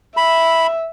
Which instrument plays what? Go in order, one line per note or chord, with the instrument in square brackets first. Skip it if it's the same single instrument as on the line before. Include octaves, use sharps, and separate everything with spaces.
[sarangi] E5 [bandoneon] B5